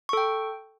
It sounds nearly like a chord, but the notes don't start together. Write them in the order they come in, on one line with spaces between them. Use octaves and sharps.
C#6 A4 G5